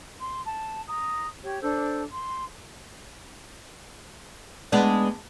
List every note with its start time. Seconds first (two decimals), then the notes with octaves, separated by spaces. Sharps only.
0.19 C6
0.45 A5
0.87 A#5 D#6
1.43 G4 C#5
1.62 D4 A4 C5
2.10 C6
4.72 G#3 B3 D4